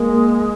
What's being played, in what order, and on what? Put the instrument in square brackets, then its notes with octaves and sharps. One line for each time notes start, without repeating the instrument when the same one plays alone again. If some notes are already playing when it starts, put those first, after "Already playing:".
Already playing: [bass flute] G#3 [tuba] A#3